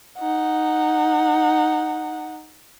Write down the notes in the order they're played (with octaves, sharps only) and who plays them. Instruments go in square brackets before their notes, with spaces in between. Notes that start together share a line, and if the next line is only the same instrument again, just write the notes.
[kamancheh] D#4 F#5